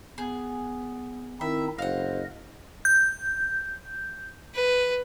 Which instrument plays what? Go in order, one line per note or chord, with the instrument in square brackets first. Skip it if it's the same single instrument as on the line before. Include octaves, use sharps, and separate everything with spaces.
[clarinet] B3 [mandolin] G#4
[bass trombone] D#3 [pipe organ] C4 D#4 E4 [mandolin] E5
[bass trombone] F#1 [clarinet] C5 [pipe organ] D#5 [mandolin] F5 F#5
[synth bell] G6
[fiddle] B4